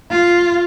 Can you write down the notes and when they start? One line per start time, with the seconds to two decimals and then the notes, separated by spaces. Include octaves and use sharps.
0.11 F4